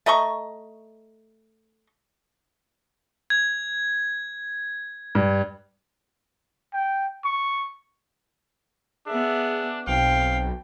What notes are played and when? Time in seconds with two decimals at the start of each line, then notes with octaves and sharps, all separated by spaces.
0.06 A3 D#5 A#5 C#6
3.30 G#6
5.15 G2
6.73 G5
7.24 C#6
9.07 B3 D4 G#4 E5
9.87 B1 C4 F5 G5